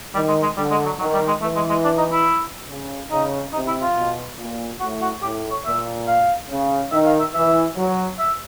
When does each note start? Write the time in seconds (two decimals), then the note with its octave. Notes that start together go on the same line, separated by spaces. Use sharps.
0.14 D#3 G3
0.28 G#3
0.42 G#3
0.57 D3 G3
0.71 G#3
0.85 F#3
0.99 D#3 F#3
1.13 G3
1.28 G#3
1.41 E3 A3
1.55 G#3
1.69 G#3
1.84 D4
1.98 D#4
2.12 E4
2.68 C#3
3.11 C#3 D#4
3.53 C3 D#4
3.67 E4
3.81 F4
3.95 B2
4.38 A#2
4.80 A2 F#4
5.01 F#4
5.22 A2 G4
5.50 C#5
5.65 A#2 E5
6.07 F5
6.49 C#3
6.92 D#3 E5
7.05 F5
7.20 E5
7.34 E3 E5
7.77 F#3
8.19 E5